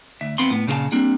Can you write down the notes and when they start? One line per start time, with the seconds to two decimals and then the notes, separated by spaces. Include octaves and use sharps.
0.21 D2 E5
0.38 E2 B3 C4 F5 B5 C6
0.50 A2 B3
0.67 A#2 C#3 F#4 A#4 F5 A5
0.92 G3 A#3 C4 D4